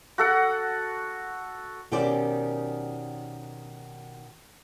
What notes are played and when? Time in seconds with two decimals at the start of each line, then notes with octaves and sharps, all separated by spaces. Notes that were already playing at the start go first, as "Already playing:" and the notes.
0.18 F#4 A4 F#5
1.91 B2 D#3 C#4 G4 C5 D5